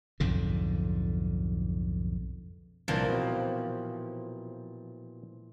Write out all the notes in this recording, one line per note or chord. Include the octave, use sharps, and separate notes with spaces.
B1 F2 G#2 D3
C2 A#2 E3 F3 D4 A5
B2 C4